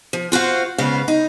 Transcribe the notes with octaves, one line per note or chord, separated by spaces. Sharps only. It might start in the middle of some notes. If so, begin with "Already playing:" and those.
F3
F4 F#4 C5 F5
G#2 C#3 B3 F5
D#4